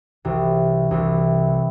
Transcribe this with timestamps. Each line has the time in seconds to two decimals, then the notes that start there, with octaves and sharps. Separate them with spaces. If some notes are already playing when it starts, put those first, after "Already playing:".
0.25 C2 C3 E3
0.91 C2 C3 E3